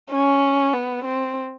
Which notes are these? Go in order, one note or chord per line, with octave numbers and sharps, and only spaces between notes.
C#4
B3
C4